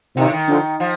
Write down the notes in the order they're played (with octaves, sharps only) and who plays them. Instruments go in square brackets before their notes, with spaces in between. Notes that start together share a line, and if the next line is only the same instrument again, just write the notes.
[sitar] A2 [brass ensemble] C3 D#3
[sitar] D#3
[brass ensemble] D3 F3
[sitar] F3